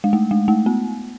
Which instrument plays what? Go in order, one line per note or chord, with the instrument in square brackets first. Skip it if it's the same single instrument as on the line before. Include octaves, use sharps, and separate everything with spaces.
[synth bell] G#3
A3
G#3
A3
B3